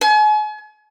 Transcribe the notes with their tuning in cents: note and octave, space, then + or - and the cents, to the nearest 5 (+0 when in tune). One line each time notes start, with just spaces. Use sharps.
G#5 +40